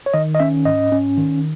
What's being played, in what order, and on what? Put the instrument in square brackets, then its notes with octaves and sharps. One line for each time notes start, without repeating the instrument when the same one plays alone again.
[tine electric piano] C#5
D#3 D#5
D#5
C#4 E5
G#2 D#5
C#4
D#3